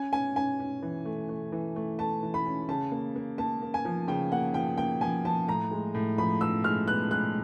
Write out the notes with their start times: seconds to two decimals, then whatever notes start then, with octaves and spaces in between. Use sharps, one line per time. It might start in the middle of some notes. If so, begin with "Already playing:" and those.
Already playing: C#4 G#5
0.13 C#4 G#5
0.36 C#4 G#5
0.60 C#4
0.82 E3
1.05 A3
1.29 A3
1.52 E3
1.76 A3
1.99 A3 A5
2.23 E3
2.34 B5
2.46 C#4
2.68 C#3 A5
2.92 A#3
3.16 A#3
3.38 A#3 A5
3.62 A#3
3.74 G#5
3.85 F3
4.08 C#3 G5
4.32 A#3 F#5
4.54 F3 G5
4.78 A#3 G5
5.01 F3 G#5
5.25 F3 A5
5.48 A2 A#5
5.71 G#3
5.94 A2
6.18 F3 B5
6.41 F3 E6
6.64 G#3 F6
6.87 B3 F#6
7.11 G#3 F#6